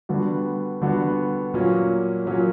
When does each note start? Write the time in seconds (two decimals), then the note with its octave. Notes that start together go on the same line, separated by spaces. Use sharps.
0.09 D3 G3 B3 F#4
0.82 D3 G3 B3 F#4
1.54 A#2 F#3 A#3 C#4 F#4
2.26 A#2 F#3 A#3 C#4 F#4